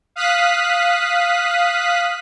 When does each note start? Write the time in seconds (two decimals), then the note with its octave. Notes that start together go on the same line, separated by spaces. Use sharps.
0.16 F5 D#6 F#6 B6